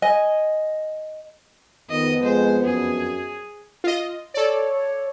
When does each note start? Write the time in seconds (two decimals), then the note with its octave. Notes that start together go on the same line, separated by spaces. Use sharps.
0.02 D#5 G#5
1.90 F2 D#3 B3 D#5
2.23 G#3 C5
2.65 F#2 G#4
3.84 F4 D#5
4.34 A4 C#5 D5